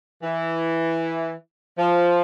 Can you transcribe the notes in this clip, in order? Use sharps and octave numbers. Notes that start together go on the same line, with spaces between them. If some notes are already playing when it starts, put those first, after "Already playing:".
E3
F3